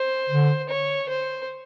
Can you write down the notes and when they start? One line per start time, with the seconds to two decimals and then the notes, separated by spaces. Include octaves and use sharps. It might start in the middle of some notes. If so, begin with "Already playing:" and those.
Already playing: C5
0.29 D3
0.69 C#5
1.08 C5